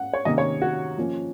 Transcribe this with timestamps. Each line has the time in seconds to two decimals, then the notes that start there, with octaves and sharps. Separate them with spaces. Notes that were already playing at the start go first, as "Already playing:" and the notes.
Already playing: C#4 F#5
0.13 C#5
0.25 C3 D#3 A#3 C#4 D#5
0.38 C#5
0.62 F#4
0.98 F3 A#3 C#4